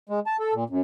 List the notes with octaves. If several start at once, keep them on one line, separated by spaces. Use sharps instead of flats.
G#3
A5
A4
A#2
F#2